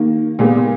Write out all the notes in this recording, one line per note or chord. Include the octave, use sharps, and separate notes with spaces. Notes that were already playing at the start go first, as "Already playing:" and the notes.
Already playing: D#3 A#3
A#2 G#3 B3